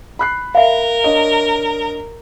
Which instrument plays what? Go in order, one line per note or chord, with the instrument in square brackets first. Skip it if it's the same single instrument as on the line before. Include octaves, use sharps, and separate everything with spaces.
[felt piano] B5 F#6 C7
[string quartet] A#4 [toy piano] E5 F5
[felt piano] D4 C#5 D#5